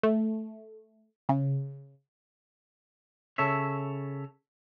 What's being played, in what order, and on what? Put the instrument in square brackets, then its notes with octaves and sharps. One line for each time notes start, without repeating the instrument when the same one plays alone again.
[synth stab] A3
C#3
[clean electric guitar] C#3 A4 C#5 E5